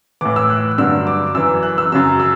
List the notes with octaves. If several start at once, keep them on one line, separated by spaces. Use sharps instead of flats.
A2 E3 D6
E6
F#6
G2 D3 F#3 E6
D6
F#2 E3 E6
F#6
E6
F#2 C#3 F#3 E6
E6